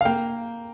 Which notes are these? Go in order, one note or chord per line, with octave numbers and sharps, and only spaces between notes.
F5
A#3 G5